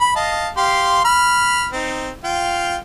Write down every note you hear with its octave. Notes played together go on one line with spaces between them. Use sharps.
B5
D#5 F5 A5
G4 F5 C6
B5 F6
C4 D#4
F4 F5 G5